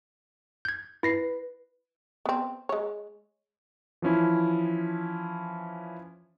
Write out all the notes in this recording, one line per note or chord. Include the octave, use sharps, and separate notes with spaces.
G6 G#6
E4 B4 A#6 C7
B3 C4
G#3 C#5
E3 F3 C#4 E4